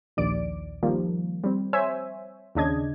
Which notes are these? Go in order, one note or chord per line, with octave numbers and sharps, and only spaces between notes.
A#1 D#2 D5 D7
D#3 F3 G3 A#3
G3 C4
C5 C#5 E5 G#5
D#2 C#3 D4 D#5 G#6